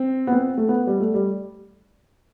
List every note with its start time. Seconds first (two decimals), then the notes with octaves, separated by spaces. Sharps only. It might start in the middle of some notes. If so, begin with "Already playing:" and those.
Already playing: C4
0.27 B3
0.32 C4
0.57 A3
0.69 B3
0.87 G3
1.00 A3
1.14 G3